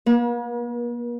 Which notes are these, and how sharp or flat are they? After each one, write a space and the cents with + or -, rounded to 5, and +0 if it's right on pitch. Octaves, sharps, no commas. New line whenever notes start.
A#3 +40 B4 -45